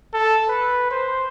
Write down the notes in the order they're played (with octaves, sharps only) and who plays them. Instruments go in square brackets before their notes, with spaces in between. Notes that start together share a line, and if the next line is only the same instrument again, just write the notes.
[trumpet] A4
B4
C5